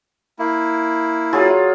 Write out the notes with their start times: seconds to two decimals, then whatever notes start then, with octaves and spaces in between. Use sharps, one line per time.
0.39 A#3 E4
1.33 F#3 F4 G#4